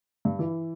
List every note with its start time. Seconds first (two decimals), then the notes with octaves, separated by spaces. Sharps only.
0.25 G2
0.39 E3